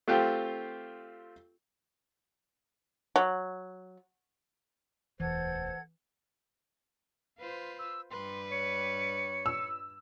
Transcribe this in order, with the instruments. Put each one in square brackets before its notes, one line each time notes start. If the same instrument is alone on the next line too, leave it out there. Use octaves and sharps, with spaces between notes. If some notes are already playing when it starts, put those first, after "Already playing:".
[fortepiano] A3 C4 F4 G4
[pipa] F#3
[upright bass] E1 D2 [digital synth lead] E3 [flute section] A4 F#5 G#6 [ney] C5
[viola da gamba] F4 B4 C5
[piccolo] E6
[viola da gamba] G2 G3 B4 [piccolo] C6
[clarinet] C#5 [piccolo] C#7
[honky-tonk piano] E6